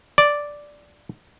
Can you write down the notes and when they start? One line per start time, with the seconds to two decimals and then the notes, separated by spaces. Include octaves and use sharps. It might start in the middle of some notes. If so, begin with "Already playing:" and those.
0.18 D5